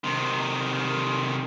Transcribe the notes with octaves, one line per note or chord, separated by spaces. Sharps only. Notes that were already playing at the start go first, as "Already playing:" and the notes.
C3 D#3